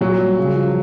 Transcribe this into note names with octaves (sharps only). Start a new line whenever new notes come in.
A#2 F#3
G3
C#3
F3